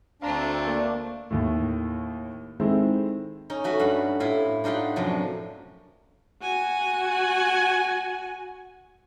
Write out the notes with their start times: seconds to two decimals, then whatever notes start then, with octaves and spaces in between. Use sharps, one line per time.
0.22 D2 A3 C4 D4 F5 A#5
0.67 A#3 D5
1.30 D#2 A2
2.60 D#3 G#3 C4 E4 A4
3.50 C#4 D#4
3.64 A3 F#4 B4
3.80 G2 F#5 B5
4.20 A2 E4 F4
4.64 D4 D#4 F4 G4 F#5
4.96 F#2 C3 F3 D4
6.42 F#4 G#5